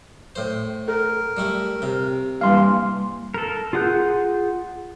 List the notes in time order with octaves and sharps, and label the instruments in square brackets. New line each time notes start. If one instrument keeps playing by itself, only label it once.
[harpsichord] A2 C5
[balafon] A4 [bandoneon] A#4
[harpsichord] G3 A3 E4
C3
[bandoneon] G2 E3 [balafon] G3 A#3 [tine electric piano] F5 C6
[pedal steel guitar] A4 A#4
F4 G#4 F#5 F#6 G6